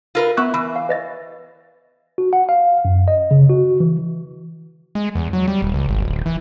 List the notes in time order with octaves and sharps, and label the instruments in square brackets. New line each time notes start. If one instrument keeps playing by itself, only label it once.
[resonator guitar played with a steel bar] F4 A#4 B4
[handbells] B3 C#6 F#6 [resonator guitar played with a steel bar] E4
[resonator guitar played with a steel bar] E3 [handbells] B5
[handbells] F5
B4 D#5 A6
[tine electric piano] F#4
F#5
F5
F#2
D#5
C#3
F#4
E3
[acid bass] G#3
E2
F#3
G3
D#1
C#2
G#1
D1
E3